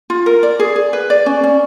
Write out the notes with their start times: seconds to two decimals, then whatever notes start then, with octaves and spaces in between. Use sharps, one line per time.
0.10 F4
0.26 A#4
0.43 D5
0.60 G#4
0.76 G#4
0.93 B4
1.10 D5
1.26 C#4
1.43 C#4